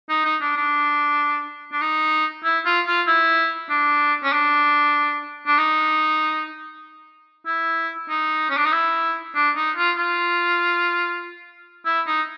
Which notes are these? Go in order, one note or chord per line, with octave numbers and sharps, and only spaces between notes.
D#4
D#4
D4
D4
D4
D#4
E4
F4
F4
E4
D4
C#4
D4
D4
D#4
E4
D#4
C#4
D4
D#4
E4
D4
D#4
F4
F4
E4
D#4